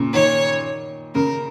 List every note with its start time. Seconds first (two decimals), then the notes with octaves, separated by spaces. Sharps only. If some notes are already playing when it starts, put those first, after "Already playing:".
Already playing: A#2 C#3
0.14 D#3 C#5
1.15 C#3 A#4